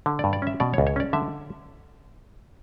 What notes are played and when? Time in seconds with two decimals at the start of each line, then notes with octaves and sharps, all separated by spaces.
0.06 D3
0.19 D5
0.24 G2
0.33 D5
0.42 C#4 E5
0.60 B2 D5
0.74 C#5
0.78 C#2
0.87 C#5
0.96 C#4 D5
1.13 D3 E5